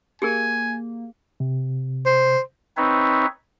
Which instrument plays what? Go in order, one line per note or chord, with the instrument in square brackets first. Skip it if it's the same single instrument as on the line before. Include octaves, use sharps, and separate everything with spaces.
[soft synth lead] A#3 [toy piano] G4 G#4 A#4 [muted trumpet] G#5
[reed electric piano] C3
[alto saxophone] C5
[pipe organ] C4 D#4 B4 C#5 E5